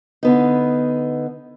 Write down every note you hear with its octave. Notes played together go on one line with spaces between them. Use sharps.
D3 B3 D#4